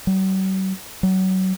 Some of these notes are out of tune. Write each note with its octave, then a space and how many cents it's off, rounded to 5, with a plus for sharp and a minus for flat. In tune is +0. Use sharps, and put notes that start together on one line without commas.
F#3 +45
F#3 +25